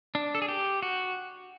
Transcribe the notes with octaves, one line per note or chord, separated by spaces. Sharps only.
D4
A4
G#4
G4
F#4